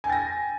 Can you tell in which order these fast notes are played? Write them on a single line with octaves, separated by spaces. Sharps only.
G#5 G5 A6 A#6